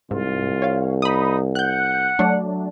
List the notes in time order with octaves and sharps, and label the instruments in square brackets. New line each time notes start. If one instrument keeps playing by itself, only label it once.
[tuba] C2 [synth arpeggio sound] G#2 [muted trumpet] F4
[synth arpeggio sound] C#5 F5
[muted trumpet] D#4 [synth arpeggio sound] B5 D#6
[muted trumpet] F#5 [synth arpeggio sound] F#6 G6
[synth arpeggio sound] F#3 A3 D4